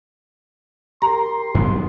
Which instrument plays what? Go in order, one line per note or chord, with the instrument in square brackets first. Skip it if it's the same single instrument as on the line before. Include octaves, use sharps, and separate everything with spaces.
[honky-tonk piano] G4 A#4 [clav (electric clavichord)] A#5 [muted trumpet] C6
[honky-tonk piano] B1 F#3 [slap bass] G2 B3